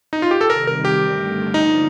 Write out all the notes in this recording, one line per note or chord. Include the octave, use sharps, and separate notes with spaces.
D#4
F4
G4
A4
C3 D#3 G3 A#4
A#4
G4
G2 D3 A3
D3 F3 A#3 D4 D#4